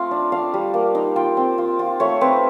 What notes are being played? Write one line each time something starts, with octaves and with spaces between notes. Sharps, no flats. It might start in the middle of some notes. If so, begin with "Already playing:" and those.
Already playing: A3 C4 F4
D4
D4 F5
G3
A#3
D#4
F4 G5
C4
F4
F4
A3 C#5
C4 B4